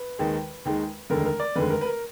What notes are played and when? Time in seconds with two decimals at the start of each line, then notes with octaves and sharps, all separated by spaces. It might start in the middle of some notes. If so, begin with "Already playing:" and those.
Already playing: B4
0.19 D#2 D#3 G#3
0.65 D#2 D#3 G#3
1.10 F1 D#2 D3 G#3 A#4
1.25 A#4
1.40 D5
1.56 F1 D#2 D3 G#3 B4
1.70 A#4
1.81 B4
1.85 A#4